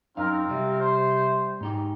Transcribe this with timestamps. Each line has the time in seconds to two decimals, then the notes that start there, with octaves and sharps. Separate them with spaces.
0.17 F#2 C4 D#4 F4 A#4 F5
0.50 C3 G3
0.79 C5
1.61 G#2 D#4 G4